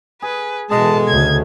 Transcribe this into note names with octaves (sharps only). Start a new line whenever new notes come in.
G#4 B4
B2 E3 G#3 A4 D#5 F#5 A5
D2 C#3 G#6